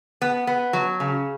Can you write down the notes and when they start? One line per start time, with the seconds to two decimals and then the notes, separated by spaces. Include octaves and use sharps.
0.22 B3
0.47 B3
0.73 F#3
1.00 C#3